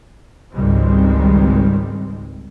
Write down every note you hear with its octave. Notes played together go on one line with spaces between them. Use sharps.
G#1 C#2 D#3 G3 G#3 C4